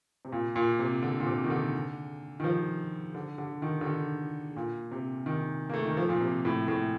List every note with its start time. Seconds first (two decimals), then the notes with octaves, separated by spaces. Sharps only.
0.25 C3
0.32 A#2
0.56 A#2
0.79 C3
1.03 D3
1.20 A#2
1.26 C3
1.44 D#3
1.50 D3
2.40 D#3
2.44 F3
3.15 D3
3.38 D3
3.62 D#3
3.81 D3
3.85 D#3
4.56 A#2
4.91 C3
5.26 D#3
5.70 A#3
5.74 A3
5.86 D#3
5.97 F3
6.09 A#2
6.21 C3
6.45 A2
6.68 A2